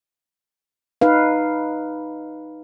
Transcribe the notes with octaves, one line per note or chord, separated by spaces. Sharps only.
D#4 B4 F5